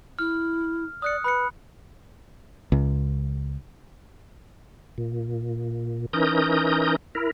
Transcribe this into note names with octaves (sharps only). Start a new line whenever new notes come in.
E4 F6
D5 D#6 F#6 C#7
B4 B5 F#6 C#7
C#2
A#2
E3 C#4 D#4 A#4 D#6 G6
E4 A#4